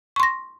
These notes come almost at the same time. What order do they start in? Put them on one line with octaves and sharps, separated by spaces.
C#6 C6 A#6